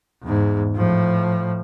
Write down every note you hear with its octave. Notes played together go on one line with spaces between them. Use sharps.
E2 G#2
A2 F3